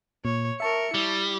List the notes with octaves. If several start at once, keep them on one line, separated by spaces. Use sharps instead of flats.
A#2 C#5
A#4 E5 A5 C#6 C#7
G3 E4